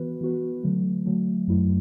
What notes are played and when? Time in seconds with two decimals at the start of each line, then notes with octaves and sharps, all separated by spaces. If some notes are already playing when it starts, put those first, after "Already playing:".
Already playing: E3 B3 F#4 B4
0.21 E3 B3 F#4 B4
0.63 D3 F#3 A3
1.06 D3 F#3 A3
1.48 F#2 F#3 A3 E4